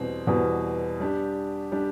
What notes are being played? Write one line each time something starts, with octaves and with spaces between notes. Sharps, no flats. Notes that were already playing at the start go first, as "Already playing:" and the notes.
Already playing: E2 B2 G3 C4
E2 B2 G3 C4
G3 D4 G4
G3 D4 G4